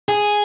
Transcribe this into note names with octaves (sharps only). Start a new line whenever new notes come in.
G#4